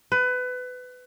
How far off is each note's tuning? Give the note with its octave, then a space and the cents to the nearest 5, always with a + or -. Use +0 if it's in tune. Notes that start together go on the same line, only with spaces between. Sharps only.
B4 +25